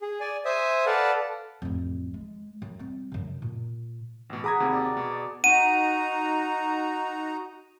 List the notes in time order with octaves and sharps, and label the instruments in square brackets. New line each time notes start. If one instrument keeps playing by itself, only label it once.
[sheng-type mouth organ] G#4
D5 G#5
C5 E5 G#5 D#6
A4 B4 D5 F5 F#5 A5
[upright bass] A1 F2
G#3
F#2
G3 C4
F#2 C#3
A#2
[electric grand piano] A1 B2
[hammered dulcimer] F#4 [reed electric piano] G#4 A#5 [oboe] B5 [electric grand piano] D6 D#6 G#6
[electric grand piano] D#2 C3
[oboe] D5
[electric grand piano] B2
[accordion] D#4 F#4 A#5 [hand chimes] F#5 [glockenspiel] D#7